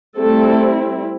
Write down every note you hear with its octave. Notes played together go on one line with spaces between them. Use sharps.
G3 A3 C4 E4 A4